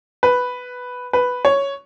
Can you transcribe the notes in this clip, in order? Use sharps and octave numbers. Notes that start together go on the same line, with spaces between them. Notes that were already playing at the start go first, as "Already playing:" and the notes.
B4
B4
C#5